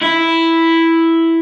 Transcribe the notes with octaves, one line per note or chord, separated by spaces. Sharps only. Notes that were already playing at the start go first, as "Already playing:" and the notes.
E4